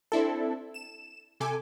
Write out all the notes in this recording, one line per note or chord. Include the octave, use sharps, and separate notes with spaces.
C4 D4 E4 A4
E7
C3 A4 G#5 D6